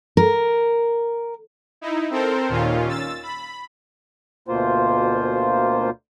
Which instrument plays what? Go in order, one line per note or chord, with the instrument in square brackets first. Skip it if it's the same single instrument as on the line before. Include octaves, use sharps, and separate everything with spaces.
[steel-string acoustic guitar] A#4
[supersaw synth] D#4 E4
C4 A4 A#4 C5
D#2 A#2 D#3 C#4 F4
E6 A6
B5
[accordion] D2 B2 A#3 F4 C5